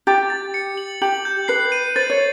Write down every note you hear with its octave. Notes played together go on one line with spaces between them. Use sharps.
G4 A6
A6
C#7
F#7
G4 F#7
G6
B4 C7
D#7
C5 A6
C#5